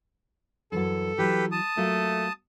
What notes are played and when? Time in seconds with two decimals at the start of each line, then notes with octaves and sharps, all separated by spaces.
0.72 F#2 E3 F#3 A4
1.18 E3 F#3 G4 B4
1.52 A5 D#6
1.77 F#3 A3 A#3 F4